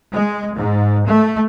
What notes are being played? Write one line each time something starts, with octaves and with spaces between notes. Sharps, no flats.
G#3
G#2
A3